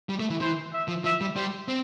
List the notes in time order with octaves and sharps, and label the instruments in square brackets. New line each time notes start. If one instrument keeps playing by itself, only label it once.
[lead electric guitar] G3
A3
E3
[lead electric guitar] E3 [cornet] C5
[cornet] E5
[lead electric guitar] F3
[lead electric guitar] F3 [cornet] E5
[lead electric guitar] G3
[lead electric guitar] G3 [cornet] C5
[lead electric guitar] C4